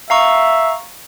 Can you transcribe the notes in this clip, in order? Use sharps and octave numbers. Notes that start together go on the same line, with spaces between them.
E5 F5 A#5 C#6